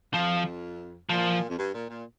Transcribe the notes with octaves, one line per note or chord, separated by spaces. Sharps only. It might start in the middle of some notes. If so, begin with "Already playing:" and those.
F2 F3
A#2 F3
F2
G2
A#2
A#2